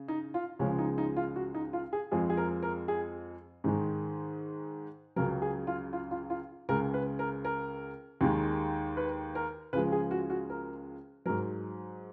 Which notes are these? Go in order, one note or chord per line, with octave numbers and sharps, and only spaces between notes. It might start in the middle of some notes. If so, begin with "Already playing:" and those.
Already playing: C#3
D#4
F4
C#2 C#3 F3 G#3 C#4
D#4
D#4
F4
F#4
D#4
F4
G#4
F2 F3 G#3 G#4
G#4
A#4
A#4
G#4
G#2 D#3 G#3
C#2 C#3 F#3 A#4
G#4
F4
F4
F4
F4
C#2 C#3 G#3 A#4
B4
A#4
A#4
D#2 D#3 G#3
B4
A#4
C#2 C#3 F3 G#3 B4
G#4
F#4
F#4
A#4
G#2 F#3 A#4